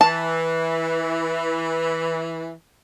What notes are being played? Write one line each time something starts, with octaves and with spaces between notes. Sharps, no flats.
E3 A5